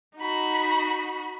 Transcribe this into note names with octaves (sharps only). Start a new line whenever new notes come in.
D#4 F#4 B5